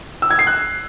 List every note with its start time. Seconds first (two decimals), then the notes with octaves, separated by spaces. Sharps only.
0.22 E6
0.31 G#6
0.39 C7
0.47 F#6